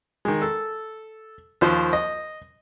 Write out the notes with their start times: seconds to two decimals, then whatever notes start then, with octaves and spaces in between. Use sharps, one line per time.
0.25 D#3 G#3
0.42 A4
1.61 D#2 F3 C5
1.93 D#5